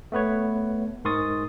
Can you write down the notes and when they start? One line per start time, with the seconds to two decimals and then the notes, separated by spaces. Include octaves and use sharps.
0.12 A3 B3 B4 C#5
1.05 G#2 A#4 C6 C#6 D#6 A6